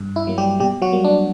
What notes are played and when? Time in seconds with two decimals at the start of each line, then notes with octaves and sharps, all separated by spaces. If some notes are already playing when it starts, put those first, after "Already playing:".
Already playing: G2
0.16 E4
0.27 F#3 A#3
0.38 G3 G4
0.60 B2 G3 G4
0.82 F#3 F#4
0.93 G3 A#3
1.05 D4